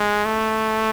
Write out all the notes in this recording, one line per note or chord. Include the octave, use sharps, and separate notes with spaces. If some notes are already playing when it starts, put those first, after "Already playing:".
Already playing: G#3
A3